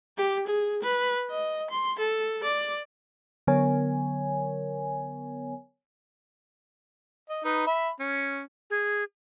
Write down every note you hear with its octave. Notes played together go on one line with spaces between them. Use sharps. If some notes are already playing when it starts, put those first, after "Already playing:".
G4
G#4
B4
D#5
C6
A4
D5
D3 F#3 B3 A#4 C#5 G#5
D#5
D#4 B4
E5 B5
C#4
G#4